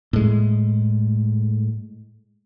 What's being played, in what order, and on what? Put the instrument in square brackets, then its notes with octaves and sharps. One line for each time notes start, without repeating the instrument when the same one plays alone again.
[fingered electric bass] A2 G#3